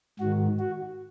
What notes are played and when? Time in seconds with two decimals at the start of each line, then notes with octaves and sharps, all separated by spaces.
0.19 G#2 D#3 F#4
0.59 F#4